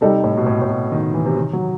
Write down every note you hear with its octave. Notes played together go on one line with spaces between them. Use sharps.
C3 G3 D#4 A4
A2
B2
A2
A2
B2
D#3
E3
C3
D#3
F#3